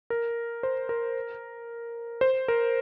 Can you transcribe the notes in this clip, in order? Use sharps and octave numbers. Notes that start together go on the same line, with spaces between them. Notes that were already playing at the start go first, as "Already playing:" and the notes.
A#4
C5
A#4
C5
A#4